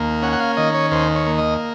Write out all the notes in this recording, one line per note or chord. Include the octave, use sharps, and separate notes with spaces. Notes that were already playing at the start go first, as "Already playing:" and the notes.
Already playing: D#2 A#3
C#4 F#5
F#5
F5
D#3 D#5
C#5
D#2 C5
C#5
A#3
D#5